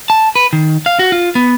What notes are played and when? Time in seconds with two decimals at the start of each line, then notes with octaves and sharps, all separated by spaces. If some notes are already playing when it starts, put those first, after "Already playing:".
0.10 A5
0.36 B4
0.53 D#3
0.86 F5
0.99 F#4
1.12 F4
1.35 B3